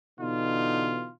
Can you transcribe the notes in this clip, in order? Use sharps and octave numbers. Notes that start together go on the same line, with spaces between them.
B2 D3 E3 D#4 F4